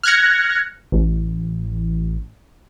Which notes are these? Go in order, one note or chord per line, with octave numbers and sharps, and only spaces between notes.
F6 F#6 G#6 A#6 C#7
A1